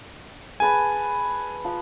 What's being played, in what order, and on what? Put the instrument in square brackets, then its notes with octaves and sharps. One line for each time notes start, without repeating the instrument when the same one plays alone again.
[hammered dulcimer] G#4 B4 A5 [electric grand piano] G#5
[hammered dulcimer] F3